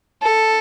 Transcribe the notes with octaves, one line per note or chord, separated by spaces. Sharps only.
A4